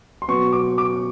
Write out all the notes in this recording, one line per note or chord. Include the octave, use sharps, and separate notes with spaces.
C6
B2 F#3 B3 C#6
D6
D6